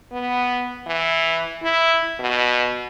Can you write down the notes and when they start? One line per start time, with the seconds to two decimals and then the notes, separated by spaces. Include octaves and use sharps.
0.12 B3
0.87 E3
1.62 E4
2.20 B2